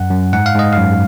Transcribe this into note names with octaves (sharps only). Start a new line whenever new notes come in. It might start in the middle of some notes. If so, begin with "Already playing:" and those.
Already playing: F#2 F#5
F#2
G#2 F#5
F5
G#2 D#5
F#2 F5